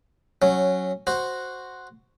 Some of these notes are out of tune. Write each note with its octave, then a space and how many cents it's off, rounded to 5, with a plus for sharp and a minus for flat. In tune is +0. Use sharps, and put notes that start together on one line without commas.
F#3 +0 C#4 -10
F#4 +0 C5 +0